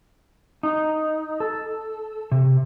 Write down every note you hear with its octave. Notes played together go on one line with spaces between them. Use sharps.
D#4
A4
C3